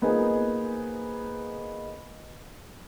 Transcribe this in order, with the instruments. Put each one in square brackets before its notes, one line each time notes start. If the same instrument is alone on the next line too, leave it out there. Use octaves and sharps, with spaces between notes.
[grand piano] A#3 B3 D#4 F4 G#4 C5